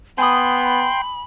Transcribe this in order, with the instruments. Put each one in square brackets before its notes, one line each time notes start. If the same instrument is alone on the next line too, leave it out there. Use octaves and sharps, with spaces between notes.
[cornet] B3 [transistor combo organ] G5 C6 [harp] G#5 D#6 [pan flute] B5